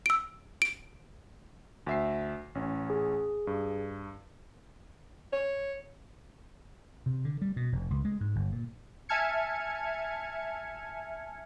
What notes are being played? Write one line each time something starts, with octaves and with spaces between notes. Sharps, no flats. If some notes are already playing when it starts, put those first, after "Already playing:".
E6 D7
D7
D2 E5 C7
A1 C#4
G#4
G2
C#5
C3
D3
G3
B2
F1
C#2
G#3
G#2
G1
A#2
E5 G#5 A5 F6 G#6 C#7